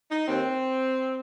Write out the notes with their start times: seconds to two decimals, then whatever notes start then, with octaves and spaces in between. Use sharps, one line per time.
0.11 D#4
0.28 D#2 C4